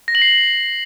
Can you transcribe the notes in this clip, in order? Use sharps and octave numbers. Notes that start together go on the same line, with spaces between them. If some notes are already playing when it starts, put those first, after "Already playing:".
A#6
F#7
C7